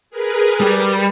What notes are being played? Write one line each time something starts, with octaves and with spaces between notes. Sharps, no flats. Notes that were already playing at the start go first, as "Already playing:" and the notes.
G#4 A#4 B4
G3